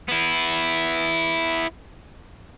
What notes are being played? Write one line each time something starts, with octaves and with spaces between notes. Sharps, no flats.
B3 E4